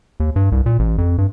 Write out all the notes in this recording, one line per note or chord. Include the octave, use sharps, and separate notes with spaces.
D#2
G2
C2
A#2
A1
F2
G2